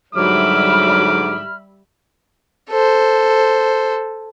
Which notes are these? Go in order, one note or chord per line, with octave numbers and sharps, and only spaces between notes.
G#2 D3 F#3 G3 E5 B5 D6 F6
A4 C5